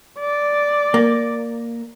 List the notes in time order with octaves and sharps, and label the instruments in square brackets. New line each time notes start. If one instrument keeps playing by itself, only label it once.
[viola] D5
[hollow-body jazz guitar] A#3